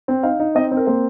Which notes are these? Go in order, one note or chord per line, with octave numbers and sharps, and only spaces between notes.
C4
D#4 F5
D#4
C4 D#5
C4
A#4
A#3 C5